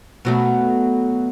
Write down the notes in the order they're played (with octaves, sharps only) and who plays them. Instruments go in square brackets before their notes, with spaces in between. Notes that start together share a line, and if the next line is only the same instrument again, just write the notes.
[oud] B2 F#3 A3